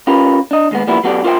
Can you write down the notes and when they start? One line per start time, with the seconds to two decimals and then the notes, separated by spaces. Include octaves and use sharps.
0.07 C#4 F4 G4 A#4 B4
0.51 D4 D#5
0.71 D#2 G#3 B3
0.87 F3 G3 A#3 B3 E4
1.04 F#3 B3 F#4 G4 A4 D5
1.24 F4 A#4 C5 E5 F5 G5